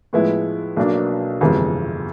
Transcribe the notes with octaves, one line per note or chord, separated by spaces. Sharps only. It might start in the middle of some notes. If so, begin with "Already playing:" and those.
A2 F3 G#3 B3 E4
B1 B2 F#3 A#3 D4
G1 F2 C3 E3 G#3